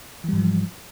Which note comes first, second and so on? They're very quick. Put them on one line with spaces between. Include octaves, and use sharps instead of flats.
E3 G3 G#2 F3